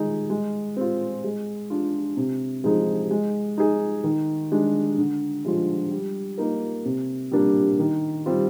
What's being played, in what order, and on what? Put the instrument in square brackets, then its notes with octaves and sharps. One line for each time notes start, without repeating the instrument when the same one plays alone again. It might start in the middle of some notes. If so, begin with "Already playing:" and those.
Already playing: [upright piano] D#3 G#3 D#4 G#4
G#3
C4 F4
G#3
D4 F4
C3
F3 G#3 D#4 G#4
G#3
D#4 G#4
D#3
G#3 D4
D3
F3 G#3 D4 F4
G3
A#3 D#4 A#4
C3
G3 A#3 D4 G4
D#3
G3 C4 F4